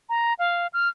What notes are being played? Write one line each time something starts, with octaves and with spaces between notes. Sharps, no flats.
A#5
F5
F6